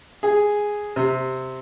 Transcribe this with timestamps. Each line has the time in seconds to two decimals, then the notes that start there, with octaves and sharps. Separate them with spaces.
0.23 G#4
0.96 C3